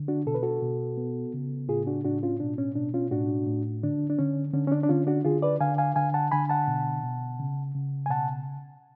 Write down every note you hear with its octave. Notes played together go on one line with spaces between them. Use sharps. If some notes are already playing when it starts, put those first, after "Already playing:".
Already playing: D3
D4 F#4
B2 A4
B4
F#4 A4
B2
B3
C#3
A2 F4 G#4
D4 F#4
A2 D4 F#4
C#4 F4
B2 D4
C#4
B2 D4
C#4 F4
A2 D4 F#4
A2
D3 D4
D4
D3 C#4
D3 C#4
C#4
D4
D4
D3 C#4 F4
D4 F#4
D3 F4 G#4
B4 D5
D3 F5 G#5
F5 G#5
D3 F5 G#5
F#5 A5
D3 G#5 B5
F#5 A5
B2
B2
C#3
C#3
G#5
B2 F#5 A5